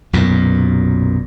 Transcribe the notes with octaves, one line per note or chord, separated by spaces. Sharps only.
B1 F#2 A#2